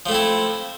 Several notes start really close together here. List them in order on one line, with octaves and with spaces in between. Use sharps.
F3 A3 C4 E4